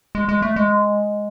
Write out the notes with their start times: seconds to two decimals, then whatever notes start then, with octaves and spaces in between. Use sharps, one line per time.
0.15 G#3
0.29 G#3
0.42 A3
0.56 G#3